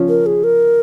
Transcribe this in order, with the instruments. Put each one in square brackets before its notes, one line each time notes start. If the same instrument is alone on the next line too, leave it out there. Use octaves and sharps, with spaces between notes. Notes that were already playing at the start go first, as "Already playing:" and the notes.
Already playing: [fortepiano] F3 C#4
[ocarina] A#4
G#4
A#4